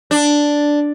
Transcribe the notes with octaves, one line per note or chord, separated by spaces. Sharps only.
D4